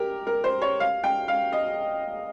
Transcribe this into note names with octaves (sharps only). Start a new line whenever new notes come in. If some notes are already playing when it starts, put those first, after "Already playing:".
Already playing: G4 A#4
A#4
C5
C#5
F5
G5
F5
D#5